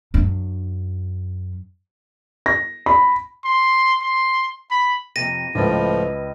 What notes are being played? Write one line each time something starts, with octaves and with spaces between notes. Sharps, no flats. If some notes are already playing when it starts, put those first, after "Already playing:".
F#2 D4
A#6
B5
C6
C6
B5
F2 C3 A#6 D#7
C#2 A2 F3 D4 B4 D#5